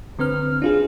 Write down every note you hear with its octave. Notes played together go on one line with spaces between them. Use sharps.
D3 C4 B4 F6
D4 F4 G#4